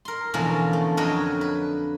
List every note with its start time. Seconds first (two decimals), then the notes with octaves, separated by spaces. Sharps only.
0.05 A#4 C6
0.34 E2 B2 D3 F3 A#3 C#4
0.73 A3
0.97 F2 D3 F#3 A#4 C#5 D#5
1.41 B4